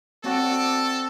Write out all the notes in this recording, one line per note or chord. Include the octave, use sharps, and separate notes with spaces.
C4 F#4 A4 D5 A5